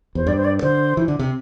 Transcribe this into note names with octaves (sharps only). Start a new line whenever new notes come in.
E2 C5
G2 D5
C5
D5
D3 C5
E3
D3
C3